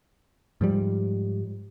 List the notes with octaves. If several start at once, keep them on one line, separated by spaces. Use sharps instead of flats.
G#2 F3 G3